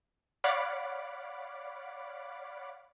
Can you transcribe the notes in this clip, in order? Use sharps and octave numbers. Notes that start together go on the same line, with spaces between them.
C#5 D5 F5 F#5 B5 D6